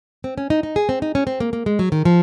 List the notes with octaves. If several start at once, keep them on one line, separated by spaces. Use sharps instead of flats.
C4
C#4
D#4
D#4
G#4
C4
D#4
C#4
C4
A#3
A#3
G#3
F#3
D#3
F3